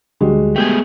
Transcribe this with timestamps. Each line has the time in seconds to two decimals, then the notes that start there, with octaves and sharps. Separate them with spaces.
0.21 D2 G3 G#3 F#4
0.56 A3 B3 G4 G#4 G6